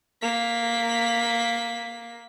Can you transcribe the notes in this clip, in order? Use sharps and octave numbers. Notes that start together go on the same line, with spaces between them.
A#3 B6